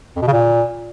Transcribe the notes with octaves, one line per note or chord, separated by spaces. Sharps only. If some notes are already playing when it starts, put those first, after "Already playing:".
F2
B2
C#3
A#2